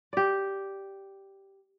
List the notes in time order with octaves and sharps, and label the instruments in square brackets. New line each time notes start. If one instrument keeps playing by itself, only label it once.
[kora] G4 D5